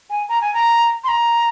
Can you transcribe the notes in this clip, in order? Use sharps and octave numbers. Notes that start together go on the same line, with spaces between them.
G#5
A#5
G#5
A#5
C6
A#5